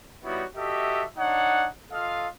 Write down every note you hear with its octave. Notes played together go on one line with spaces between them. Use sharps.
G3 B3 D#4 E4 F#4 C#5
F#4 G4 A4 D#5 E5
D4 D#4 C#5 F#5
F4 A4 D#5 F5